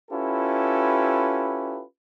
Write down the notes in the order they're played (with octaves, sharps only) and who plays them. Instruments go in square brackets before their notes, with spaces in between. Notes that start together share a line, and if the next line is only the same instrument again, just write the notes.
[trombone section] C#4 E4 F4 G4 A4 B4